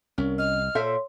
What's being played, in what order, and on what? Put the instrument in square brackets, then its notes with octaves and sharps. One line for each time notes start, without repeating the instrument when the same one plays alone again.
[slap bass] C2 [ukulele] C#4 [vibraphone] A#4
[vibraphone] D#5 [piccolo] F6
[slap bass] A#2 [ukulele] A4 C5 E5 [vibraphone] C#5 C6